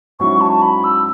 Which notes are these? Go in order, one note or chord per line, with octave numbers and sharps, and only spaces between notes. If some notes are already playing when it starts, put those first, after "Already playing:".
G#2 F#3 C#4 E4 C#6
A5
B5
E6